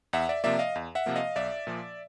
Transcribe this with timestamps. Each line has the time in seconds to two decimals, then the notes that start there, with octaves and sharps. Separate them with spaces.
0.13 E2 E5 F#5
0.29 D5 E5
0.44 C3 F3 A#3 D5 E5
0.59 D#5 F5
0.75 E2
0.95 E5 F#5
1.06 C3 F3 A#3
1.16 D#5 F5
1.36 B1 D5 E5
1.67 A#2 F3